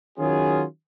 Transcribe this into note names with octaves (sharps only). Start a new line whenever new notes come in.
D#3 F#3 C#4 F4 G#4